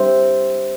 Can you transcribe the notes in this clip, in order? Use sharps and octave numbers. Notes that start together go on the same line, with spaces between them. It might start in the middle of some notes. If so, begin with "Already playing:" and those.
Already playing: G3 D4 G4 C5 E5